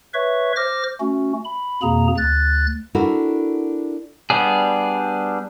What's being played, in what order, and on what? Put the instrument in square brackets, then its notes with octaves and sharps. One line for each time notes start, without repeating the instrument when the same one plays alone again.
[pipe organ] B4 C#5 E5 C#6
C5 D6 F6 A#6
A3 C#4 F#4
B5
F2 B2 A#3 G#4 A#5
D2 F#6 A6
[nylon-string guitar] D4 E4 F#4 A4 A#4
[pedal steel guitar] G3 B3 D4 G#4